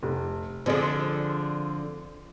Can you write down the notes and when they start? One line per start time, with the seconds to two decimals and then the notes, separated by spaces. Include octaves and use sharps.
0.03 F1
0.66 D3 F3 C4 G#4 D5